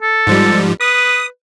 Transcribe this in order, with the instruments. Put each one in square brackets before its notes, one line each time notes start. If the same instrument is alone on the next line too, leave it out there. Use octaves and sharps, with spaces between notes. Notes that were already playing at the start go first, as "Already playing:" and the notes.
[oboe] A4
[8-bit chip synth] G#2 F3 G3
[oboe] B4 [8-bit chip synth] D#6